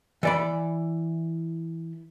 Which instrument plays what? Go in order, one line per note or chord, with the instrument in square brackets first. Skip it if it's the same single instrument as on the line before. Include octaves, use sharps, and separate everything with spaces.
[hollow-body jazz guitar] E3 D5 B5